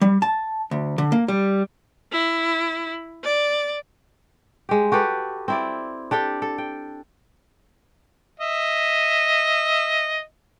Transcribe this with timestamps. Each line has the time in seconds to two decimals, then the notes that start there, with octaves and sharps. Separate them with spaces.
0.02 G3
0.22 A5
0.71 D2
0.98 D3
1.12 A#3
1.28 G3
2.12 E4
3.24 D5
4.69 G#3 G4
4.92 F#4 G4 A4 B4
5.48 C4 E4 D5
6.11 D4 G4 A4 G5
6.42 A4
6.58 G5
8.40 D#5 E5